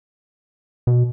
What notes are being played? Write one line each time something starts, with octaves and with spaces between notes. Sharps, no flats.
B2